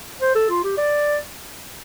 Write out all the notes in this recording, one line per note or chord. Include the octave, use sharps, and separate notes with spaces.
C5
A4
F4
G4
D5